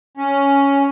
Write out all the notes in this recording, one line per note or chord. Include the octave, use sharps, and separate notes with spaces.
C#4